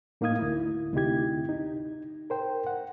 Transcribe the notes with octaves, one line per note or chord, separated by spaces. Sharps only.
A2 A#3 D#4 F5 D#6 G#6
D2 E4
D2 C3 D#4 E4 G4 G#6
D#4
A#4 C5 G5
F#5